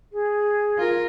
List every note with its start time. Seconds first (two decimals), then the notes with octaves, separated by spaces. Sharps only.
0.12 G#4
0.77 F4 A#4